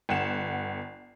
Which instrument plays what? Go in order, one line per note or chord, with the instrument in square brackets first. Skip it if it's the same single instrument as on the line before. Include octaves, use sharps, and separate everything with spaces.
[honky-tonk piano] G1 F#5 E7